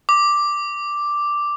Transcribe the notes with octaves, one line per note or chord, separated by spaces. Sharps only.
D6